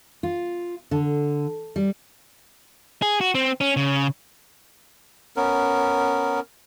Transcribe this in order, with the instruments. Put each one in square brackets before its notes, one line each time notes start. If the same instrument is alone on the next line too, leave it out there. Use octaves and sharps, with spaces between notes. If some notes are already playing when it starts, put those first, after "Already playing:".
[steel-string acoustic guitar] F4
D3
G3
[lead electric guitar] G#4
F#4
C4
C#4
C#3
[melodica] B3 C#4 A#4